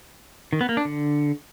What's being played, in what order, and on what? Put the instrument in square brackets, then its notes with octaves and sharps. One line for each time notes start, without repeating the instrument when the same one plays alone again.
[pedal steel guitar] D#3
B3
A#3
D4
D3